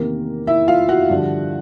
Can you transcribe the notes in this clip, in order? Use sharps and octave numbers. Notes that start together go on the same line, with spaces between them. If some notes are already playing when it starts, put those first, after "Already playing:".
Already playing: E2 C3 D#3 A#3 A#4
E4 E5
F4 F5
F#4 F#5
G2 D3 F3